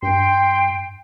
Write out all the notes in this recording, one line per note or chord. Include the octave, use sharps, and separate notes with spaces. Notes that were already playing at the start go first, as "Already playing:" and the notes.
G2 G5 C6